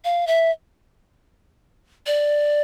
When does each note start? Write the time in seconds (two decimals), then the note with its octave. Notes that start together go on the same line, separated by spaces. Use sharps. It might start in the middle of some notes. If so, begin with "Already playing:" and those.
0.05 F5
0.27 E5
2.07 D5